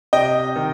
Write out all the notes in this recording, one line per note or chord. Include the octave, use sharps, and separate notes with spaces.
C3 D#5 G5
D#3